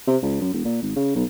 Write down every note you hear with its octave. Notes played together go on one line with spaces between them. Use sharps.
C3
C#2
F#2
E1
A#2
G#1
C#3
B1